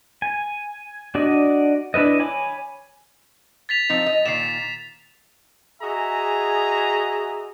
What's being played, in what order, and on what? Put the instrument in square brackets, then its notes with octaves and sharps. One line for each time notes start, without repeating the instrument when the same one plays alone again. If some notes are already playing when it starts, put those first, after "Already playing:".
[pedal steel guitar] G#5
D4 F#4 D5 D#5
D4 E4 B4 D#5
C#5 G#5 B5 D6
[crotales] A6 B6 F7
[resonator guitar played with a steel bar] F3 C4 D#4 [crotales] F7
[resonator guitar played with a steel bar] D#5
[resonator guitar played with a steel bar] A#2 D#3 [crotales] C7 E7
[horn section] F#4 G#4 D#5 E5 G#5 A#5